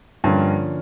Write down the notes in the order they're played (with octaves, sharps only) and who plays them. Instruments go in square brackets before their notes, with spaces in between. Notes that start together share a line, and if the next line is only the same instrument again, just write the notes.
[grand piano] G2 [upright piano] D3 F3 A#3 C#4 F4